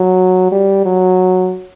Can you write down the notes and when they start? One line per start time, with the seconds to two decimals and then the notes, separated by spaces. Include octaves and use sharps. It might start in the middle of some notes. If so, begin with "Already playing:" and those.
Already playing: F#3
0.52 G3
0.85 F#3